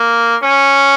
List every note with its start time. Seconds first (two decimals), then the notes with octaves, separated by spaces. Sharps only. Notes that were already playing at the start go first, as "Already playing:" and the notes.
Already playing: A#3
0.44 C#4